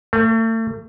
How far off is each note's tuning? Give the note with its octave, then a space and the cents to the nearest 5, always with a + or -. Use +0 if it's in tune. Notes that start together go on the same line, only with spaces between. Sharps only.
A3 +35